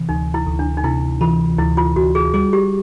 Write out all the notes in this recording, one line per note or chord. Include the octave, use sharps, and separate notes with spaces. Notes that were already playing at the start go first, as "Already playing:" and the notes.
Already playing: C3 E3
D2 D#4
E4
D2
D4
D#4
C3 E4
E3 F4
D2 E4
F4
D2 F#4
G#4
G3 G#4
G4